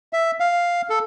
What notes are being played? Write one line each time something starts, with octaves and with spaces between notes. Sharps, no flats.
E5
F5
A4